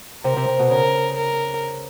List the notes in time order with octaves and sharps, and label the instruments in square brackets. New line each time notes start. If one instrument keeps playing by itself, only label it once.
[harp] C3 [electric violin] A#4
[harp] C3
C3
B2
[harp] C#3 [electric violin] A#4
[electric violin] A#4